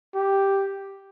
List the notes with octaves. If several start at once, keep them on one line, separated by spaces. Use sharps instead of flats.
G4